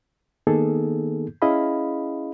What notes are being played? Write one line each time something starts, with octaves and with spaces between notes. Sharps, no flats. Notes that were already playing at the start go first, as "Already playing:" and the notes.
D#3 A#3 B3 D#4 G#4 A4
C#4 E4 G#4 D#5 F5 B5